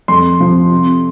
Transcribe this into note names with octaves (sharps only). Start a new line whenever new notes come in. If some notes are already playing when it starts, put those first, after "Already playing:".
F2 C6
C3 F3 C4
C3